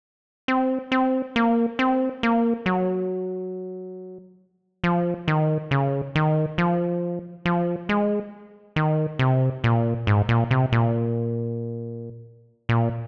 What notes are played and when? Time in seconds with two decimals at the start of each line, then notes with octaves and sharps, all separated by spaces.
0.48 C4
0.92 C4
1.36 A#3
1.79 C4
2.23 A#3
2.66 F#3
4.84 F3
5.28 D#3
5.71 C#3
6.15 D#3
6.58 F3
7.45 F3
7.89 G#3
8.76 D#3
9.19 C3
9.64 A#2
10.07 G#2
10.29 A#2
10.51 C3
10.72 A#2
12.69 A#2